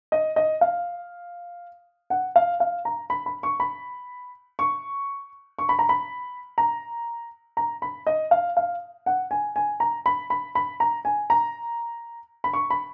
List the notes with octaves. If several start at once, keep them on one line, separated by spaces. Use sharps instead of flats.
D#5
D#5
F5
F#5
F5
F5
A#5
B5
B5
C#6
B5
C#6
C#6
B5
A#5
B5
A#5
A#5
B5
D#5
F5
F5
F#5
G#5
G#5
A#5
B5
B5
B5
A#5
G#5
A#5
B5
C#6
B5